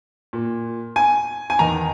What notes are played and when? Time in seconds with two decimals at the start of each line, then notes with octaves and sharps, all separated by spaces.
0.33 A#2
0.96 G#5
1.50 G#5
1.59 E2 D#3 A#5